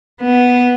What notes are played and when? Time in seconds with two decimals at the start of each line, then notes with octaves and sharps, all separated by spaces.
0.22 B3